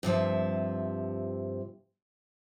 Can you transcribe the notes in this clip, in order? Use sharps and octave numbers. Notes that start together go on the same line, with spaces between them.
G2 C3 F3 E5